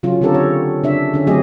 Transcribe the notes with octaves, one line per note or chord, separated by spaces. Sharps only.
C#3 F#3 C#4 F4
D3 C4 G4 A4 A#4
C#5
C#3 D4 C#5 E5
D3 C#4
F#3 A3 C4 G4 G#4 D#5